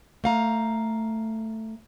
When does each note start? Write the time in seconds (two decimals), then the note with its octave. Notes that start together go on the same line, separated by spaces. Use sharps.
0.24 A3 F5 A#5